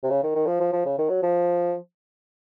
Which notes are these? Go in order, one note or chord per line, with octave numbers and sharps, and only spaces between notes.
C3
C#3
D#3
D#3
F3
F3
F3
C#3
D#3
F#3
F3